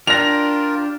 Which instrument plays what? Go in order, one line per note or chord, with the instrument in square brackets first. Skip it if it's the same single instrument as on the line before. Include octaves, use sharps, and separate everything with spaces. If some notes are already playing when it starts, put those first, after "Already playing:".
[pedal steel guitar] D4 G4 [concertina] F4 A#4 [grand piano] A#6 F7